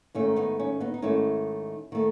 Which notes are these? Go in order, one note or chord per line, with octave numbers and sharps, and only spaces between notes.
G#2 D#3 A3 C#4
B3 D#4
C#4
B3 D#4
D#4
G#2 D#3 A3 C#4 E4
D#3 A3